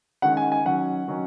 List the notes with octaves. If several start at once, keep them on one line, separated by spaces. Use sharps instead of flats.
D#3 G#3 C#4 F#5
G#5
G#5
D#3 F#3 C#4 F#5
D#3 F#3 C#4